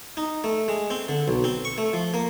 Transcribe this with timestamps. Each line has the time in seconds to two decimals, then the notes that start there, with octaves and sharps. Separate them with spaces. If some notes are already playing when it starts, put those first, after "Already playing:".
0.17 D#4
0.44 A3
0.68 G#3
0.90 C4
1.09 D3
1.28 B1
1.44 C4
1.65 C#6
1.78 A3
1.93 F3
2.14 A#3